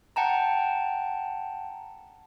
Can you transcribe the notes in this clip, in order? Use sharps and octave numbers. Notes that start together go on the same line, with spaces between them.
F#5 G5 A5 A#5